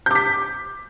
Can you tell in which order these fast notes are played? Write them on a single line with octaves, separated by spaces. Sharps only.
G6 D6 B6